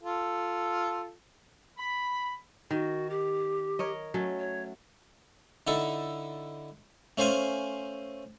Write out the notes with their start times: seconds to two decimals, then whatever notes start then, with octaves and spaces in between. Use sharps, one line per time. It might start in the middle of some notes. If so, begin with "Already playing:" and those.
0.03 F4 A4
1.78 B5
2.71 D#3 F#4
3.10 G4
3.79 A#4 C#5 D#5
4.14 F#3 A3 C#4
4.39 C#5
5.67 D3 D#4 E4 A4
7.18 A3 C#4 C5 F5 G#5